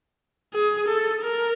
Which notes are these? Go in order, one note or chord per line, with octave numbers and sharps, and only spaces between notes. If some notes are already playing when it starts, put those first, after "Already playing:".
G#4
A4
A#4